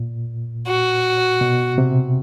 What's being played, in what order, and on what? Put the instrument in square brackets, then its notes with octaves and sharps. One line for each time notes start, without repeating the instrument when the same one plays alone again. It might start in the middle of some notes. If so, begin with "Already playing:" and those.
Already playing: [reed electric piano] A#2
[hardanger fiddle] F#4
[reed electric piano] B2
C3